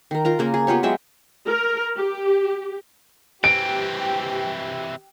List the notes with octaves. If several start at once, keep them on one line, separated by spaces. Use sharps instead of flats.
D#3 A#4
F4 A#4 A#5
C#3 A#3 A#4
G#4
B3 F4 G4 C#5
F#3 G#3 E5 G5
A#4
G4
E3 C4 G4 D7